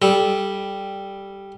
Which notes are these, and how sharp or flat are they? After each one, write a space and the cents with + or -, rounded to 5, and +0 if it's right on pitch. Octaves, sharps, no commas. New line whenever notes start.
G3 +0 A4 -15